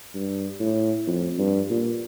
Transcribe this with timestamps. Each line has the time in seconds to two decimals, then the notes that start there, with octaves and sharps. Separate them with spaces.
0.14 G2
0.60 A2
1.07 F2
1.38 G2
1.70 A#2